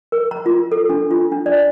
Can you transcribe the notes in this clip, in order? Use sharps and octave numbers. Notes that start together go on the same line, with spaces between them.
A#4
A#5
F4
A4
D4
F4
D4
D5